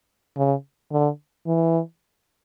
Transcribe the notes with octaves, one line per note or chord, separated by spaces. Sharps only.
C#3
D3
E3